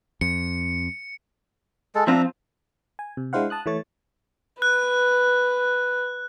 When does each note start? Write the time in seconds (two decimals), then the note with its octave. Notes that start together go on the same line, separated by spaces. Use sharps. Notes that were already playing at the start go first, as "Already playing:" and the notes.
0.21 F2 C#7
1.95 G#3 A4
2.07 F3 C4 D4 F4 E5 A#5
2.99 G#5
3.17 C3
3.33 G#3 D4 E4 C5 F5 F#5
3.50 A5 D#6 F#6
3.66 E3 A3 C#5 A6
4.62 B4 F#6